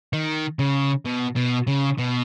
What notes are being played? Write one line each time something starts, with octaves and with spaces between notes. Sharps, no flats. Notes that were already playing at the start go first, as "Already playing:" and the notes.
D#3
C#3
B2
B2
C#3
B2